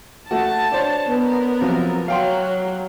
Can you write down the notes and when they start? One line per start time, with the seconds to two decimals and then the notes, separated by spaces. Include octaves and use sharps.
0.31 A3 F#4 A5
0.72 D4 C5 C#5
1.10 B3 A#4
1.61 C3 F3 F#3
2.08 F#3 F5 G5 C6